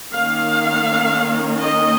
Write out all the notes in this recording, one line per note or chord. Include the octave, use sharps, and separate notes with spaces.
D#3 A#3 C#4 F5
D#5